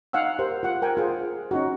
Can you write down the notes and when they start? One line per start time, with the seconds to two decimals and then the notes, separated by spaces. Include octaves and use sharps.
0.13 D#4 F5 F#5 G#5 E6
0.39 G4 A#4 C5
0.63 F4 F#5
0.82 A#4 G5 G#5
0.97 F4 G#4 C5
1.51 C#4 D#4 F#4